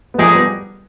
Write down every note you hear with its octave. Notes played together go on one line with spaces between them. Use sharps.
B3
F3 G#3 D#4 G#4 D5
G3 B3